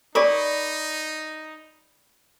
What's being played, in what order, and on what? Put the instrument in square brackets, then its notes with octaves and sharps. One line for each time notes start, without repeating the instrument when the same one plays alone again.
[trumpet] D#4 [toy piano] A#4 D5 [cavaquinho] B5 C#6 D6